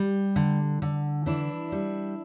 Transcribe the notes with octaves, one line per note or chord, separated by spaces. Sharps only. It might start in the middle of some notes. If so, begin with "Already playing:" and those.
Already playing: G3
D3
D3
E3 D4 E4
G3